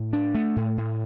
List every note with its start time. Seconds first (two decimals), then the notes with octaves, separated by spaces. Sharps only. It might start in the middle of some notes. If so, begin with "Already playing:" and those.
Already playing: A2
0.13 D4
0.35 A3
0.56 A2
0.77 A2